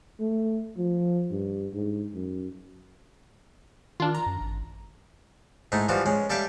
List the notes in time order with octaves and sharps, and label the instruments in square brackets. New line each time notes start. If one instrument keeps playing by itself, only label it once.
[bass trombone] A3
F3
G2
G#2
F#2
[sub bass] D#3 [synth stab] D4 F4
[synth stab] A#5
[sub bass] F#2
G#1
[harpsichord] G#2 A3 D#4 E4
E3 F3 G3 F4 F#4
G#3 C#4
G3 A4 E5 F5 G5 A5